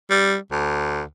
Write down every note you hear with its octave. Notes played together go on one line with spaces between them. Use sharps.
G3
D2